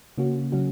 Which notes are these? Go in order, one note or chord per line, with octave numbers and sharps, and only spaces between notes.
C#3 A#3 C#4 F#4
C#3 F#3 C#4 F#4